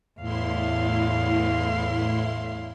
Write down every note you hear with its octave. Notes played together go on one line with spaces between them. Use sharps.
E2 A2 E4 F5 C6